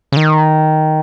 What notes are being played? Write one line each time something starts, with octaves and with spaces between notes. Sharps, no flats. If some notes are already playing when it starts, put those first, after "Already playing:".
C#3
D#3